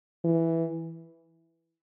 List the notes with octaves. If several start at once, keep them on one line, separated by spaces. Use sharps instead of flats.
E3